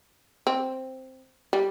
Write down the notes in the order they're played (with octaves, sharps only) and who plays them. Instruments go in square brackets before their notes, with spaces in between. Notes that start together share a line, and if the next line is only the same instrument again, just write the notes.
[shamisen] C4
G3